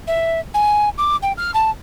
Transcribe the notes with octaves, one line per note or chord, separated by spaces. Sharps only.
E5
G#5
D6
G5
F6
A5